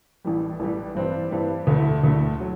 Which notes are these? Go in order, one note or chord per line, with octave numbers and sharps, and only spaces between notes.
A1 A2 E3 G3
A1 A2 E3 G3
G2 E3 G3 C4
G2 E3 G3 C4
D2 D3 A3 E4 A4
D2 D3 A3 E4 A4
F#3